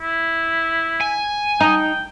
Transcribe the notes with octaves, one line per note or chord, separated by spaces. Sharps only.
E4
G#5
D#4 G5